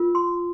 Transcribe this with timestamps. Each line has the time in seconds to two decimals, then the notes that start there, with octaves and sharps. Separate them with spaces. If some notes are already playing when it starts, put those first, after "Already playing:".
Already playing: F4 A#4
0.15 C6